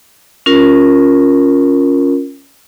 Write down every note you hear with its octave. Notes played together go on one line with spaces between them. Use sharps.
C#4 F4 A#4